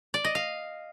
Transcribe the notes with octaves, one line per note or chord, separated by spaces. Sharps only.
D5
D#5
F5